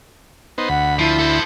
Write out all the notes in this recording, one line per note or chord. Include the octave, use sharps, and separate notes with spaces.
B3 D#4 C5
D2 F#5 B5
F3 E4
A4 C5